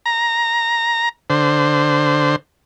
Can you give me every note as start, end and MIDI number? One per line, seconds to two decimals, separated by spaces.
0.06 1.09 82
1.30 2.36 50
1.30 2.36 72